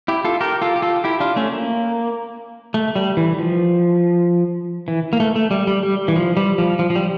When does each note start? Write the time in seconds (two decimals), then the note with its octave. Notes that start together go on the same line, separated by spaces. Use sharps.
0.08 E4 G4
0.24 F4 A4
0.41 G4 A#4
0.62 F4 A4
0.76 G4
0.82 F4 A4
1.04 E4 G4
1.20 D4 F4
1.36 A3 C#4
1.53 A#3
2.74 A3
2.96 G3
3.17 E3
3.39 F3
4.88 E3
5.13 A#3
5.20 A3
5.36 A3
5.51 G3
5.67 G3
5.83 G3
6.08 E3
6.16 F3
6.37 G3
6.58 F3
6.79 F3
6.90 F3
6.96 G3